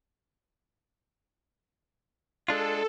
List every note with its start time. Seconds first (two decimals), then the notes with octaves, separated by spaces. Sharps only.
2.48 G#3 D4 F4 A4